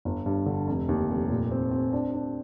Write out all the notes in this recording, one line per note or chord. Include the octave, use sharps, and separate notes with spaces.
G1
G2
D3
F1
D#2
F1
A#2
C4
C4
D4
D4